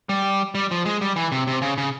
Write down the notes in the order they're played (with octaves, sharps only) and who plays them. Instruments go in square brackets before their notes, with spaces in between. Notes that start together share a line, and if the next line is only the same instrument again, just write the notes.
[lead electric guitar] G3
G3
F3
G#3
G3
E3
C3
C3
C#3
C#3